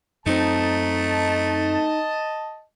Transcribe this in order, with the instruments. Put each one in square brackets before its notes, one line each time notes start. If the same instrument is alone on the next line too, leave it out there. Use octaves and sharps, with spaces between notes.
[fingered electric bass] F#2 C4 [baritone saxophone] A3 [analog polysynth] D#4 [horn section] D#5 A5